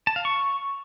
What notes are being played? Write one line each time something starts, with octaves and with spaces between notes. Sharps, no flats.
A5
F5
C#6